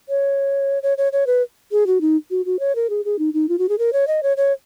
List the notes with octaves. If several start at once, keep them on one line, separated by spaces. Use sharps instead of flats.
C#5
C#5
C#5
C#5
B4
G#4
F#4
D#4
F#4
F#4
C#5
A#4
G#4
G#4
D#4
D#4
F4
F#4
G#4
A#4
C#5
D#5
C#5
C#5